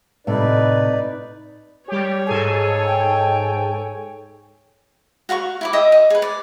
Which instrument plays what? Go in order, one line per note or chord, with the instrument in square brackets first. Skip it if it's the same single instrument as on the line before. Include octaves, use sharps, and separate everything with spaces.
[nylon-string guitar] A2 C3 [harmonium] D#4 B4 D5
[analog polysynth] G3 G4 [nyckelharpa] C#5
[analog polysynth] G#2 A4 G#5 [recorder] G#4
[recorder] G5
[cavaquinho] F#4 F5 G5 C#6
E4 B5 D6
D#5 E5 G5 D#6
D#5
G#4 B4
D5